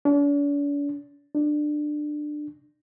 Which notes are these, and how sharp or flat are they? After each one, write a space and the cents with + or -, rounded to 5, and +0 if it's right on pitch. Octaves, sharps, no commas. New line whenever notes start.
D4 -45
D4 +20